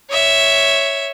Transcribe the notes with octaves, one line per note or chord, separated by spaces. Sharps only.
C#5 E5